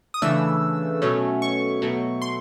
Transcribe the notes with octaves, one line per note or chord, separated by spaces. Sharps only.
D#6
C#3 E3 A3 D4 E6
B2 F#3 A3 C#4
C#6
B2 F#3 A3
C6